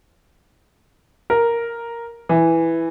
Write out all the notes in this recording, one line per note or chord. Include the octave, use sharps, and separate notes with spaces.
A#4
E3